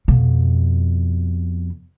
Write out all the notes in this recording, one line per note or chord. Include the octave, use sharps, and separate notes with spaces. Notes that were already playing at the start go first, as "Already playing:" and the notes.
F2 B2